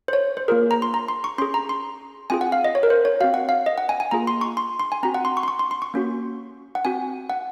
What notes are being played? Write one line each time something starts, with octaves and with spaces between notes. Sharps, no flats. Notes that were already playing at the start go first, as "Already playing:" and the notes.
C5
C#5
C5
A#3 F4 G#4 A#4
A#5
C6
A#5
C6
C#6
C#4 G#4 C6
A#5
C6
C4 F4 G#4 G#5
F#5
F5
D#5
C#5
A#4
C5
C#5
C4 F#4 F5
F#5
F5
D#5
F#5
G#5
G#5
A#3 F4 G#4 A#5
C6
C#6
C6
C6
G#5
C4 F#4 A#5
F#5
C6
C#6
C6
C#6
C6
C6
C#6
A#3 C#4 F#4
F#5
C4 F#4 G#5
F#5